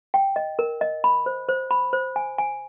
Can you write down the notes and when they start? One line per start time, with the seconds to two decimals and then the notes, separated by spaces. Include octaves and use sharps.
0.14 G5
0.36 D#5
0.59 A#4
0.81 D#5
1.04 B5
1.26 C5
1.49 C5
1.71 B5
1.93 C5
2.16 G#5
2.38 G#5